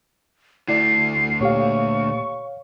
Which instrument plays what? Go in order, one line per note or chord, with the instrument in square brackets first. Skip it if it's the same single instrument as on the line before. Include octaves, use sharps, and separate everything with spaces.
[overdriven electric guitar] D2 A3 [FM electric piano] E4 D5 [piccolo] C7
[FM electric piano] A#2 G4 [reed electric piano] C#5 F5 [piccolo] C#6